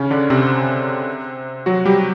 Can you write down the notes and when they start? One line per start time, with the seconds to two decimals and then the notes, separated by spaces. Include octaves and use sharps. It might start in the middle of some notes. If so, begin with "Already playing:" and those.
Already playing: C#3 C#4
0.11 D3 D4
0.30 C3 C4
1.66 F#3 F#4
1.85 G3 G4